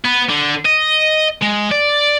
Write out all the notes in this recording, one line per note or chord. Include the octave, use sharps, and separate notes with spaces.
B3
D3
D#5
G#3
D5